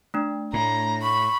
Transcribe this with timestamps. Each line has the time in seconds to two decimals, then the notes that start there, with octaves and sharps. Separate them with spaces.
0.14 A3 D4
0.53 A2 A#5
1.02 B5 C#6